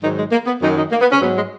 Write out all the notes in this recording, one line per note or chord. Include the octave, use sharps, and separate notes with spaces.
G#2 D#3 F#3 D#4
G#3
A#3
B3
F#2 D#3 F#3 D#4
D#4
A#3
B3
C#4
G#2 F#3 B3
G#3